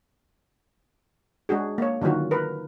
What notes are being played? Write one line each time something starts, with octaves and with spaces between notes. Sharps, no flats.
G#3 D4 F#4 G#4
A#3 C#5
D3 D#3 F#3 F4 F#4
A#4 B4